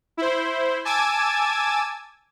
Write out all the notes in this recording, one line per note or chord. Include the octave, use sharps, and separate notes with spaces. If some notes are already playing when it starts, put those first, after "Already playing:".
E4 C5
G#5 A5 D6 E6 G#6 A6